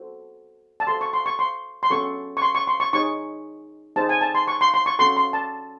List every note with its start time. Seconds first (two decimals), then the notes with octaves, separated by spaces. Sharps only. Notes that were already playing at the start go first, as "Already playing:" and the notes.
Already playing: F#4 A4 C5
0.80 A5
0.87 F#4 A4 C5 C6
1.01 C#6
1.13 C6
1.26 C#6
1.39 C6
1.83 C6
1.90 C#4 F#4 A4 C#6
2.37 C#6
2.42 C6
2.55 C#6
2.67 C6
2.80 C#6
2.93 D#4 G#4 C#5 C#6
3.96 D#4 G#4 C5 A5
4.09 G#5
4.21 A5
4.35 C6
4.48 C#6
4.61 C6
4.74 C6
4.86 C#6
4.99 C#4 F#4 A4 C6
5.17 C6
5.33 A5